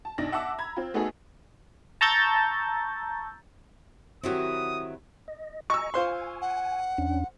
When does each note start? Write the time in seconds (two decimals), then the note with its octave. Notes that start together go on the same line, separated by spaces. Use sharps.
0.05 A5
0.18 B1 D4 D#4 A#6
0.32 E5 F#5 A5 D6 E6
0.58 A#5 B5 G#6
0.76 C4 F4
0.94 A3 B3 D#4 F#4 G#4 A4
2.01 A5 A#5 C#6 E6 G6 A6
4.24 D#3 F#3 C4 E4 F#4 G4 D#6
5.28 D#5
5.70 D#5 G#5 A#5 C#6 E6
5.94 F4 C5 G#5 C6
6.42 F#5
6.98 E2 C#4 D4